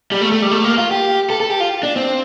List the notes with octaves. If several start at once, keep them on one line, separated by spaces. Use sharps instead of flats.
G3
A3
A3
G3
A3
A#3
F4
G4
A4
A4
G4
F4
D4
C4